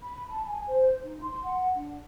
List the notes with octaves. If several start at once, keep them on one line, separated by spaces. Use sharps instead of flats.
B5
A5
G#5
C5
D#4
C6
F#5
D4